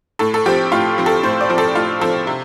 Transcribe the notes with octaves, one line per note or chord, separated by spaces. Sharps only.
A2 A4
A4
F3 C4 G4
A2 F4
F3 C4
A4
A2 C5
D5
F3 C4
A4
A2 F4
F3 C4 A4
C3